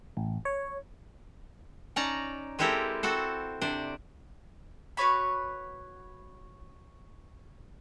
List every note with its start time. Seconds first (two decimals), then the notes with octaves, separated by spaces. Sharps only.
0.17 A1
0.45 C#5
1.96 C#4 D#4 D5 A5 A#5
2.59 G#3 C4 E4 G4 A4 A#4
3.03 C4 F#4 A4 C5
3.62 C3 D4 C5 D5
4.97 F#4 B4 C#5 B5